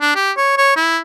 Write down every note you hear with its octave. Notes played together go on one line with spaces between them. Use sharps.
D4
G4
C#5
C#5
E4